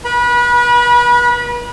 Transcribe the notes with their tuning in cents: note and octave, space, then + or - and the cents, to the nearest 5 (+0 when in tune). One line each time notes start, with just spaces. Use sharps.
B4 -35 B5 -25